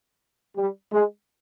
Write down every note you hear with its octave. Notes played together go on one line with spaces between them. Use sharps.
G3
G#3